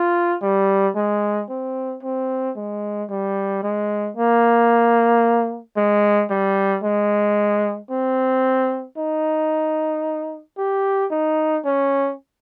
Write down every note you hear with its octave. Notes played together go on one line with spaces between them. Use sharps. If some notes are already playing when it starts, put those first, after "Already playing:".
Already playing: F4
G3
G#3
C4
C4
G#3
G3
G#3
A#3
G#3
G3
G#3
C4
D#4
G4
D#4
C#4